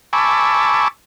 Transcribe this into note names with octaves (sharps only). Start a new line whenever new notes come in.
G#5 A5 B5 C#6 D6 E6